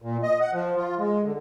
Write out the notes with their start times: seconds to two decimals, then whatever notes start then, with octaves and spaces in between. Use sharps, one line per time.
0.02 A#2
0.23 D#5
0.40 F#5
0.53 F3
0.76 F4
0.99 G#3
1.24 D3